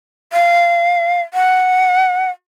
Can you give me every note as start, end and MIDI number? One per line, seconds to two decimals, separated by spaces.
0.33 1.22 77
1.34 2.30 78